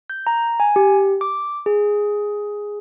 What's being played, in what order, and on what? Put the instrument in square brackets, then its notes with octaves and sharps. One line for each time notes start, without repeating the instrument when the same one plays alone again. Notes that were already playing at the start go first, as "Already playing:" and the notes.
[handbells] G6
A#5
G#5
G4
D6
G#4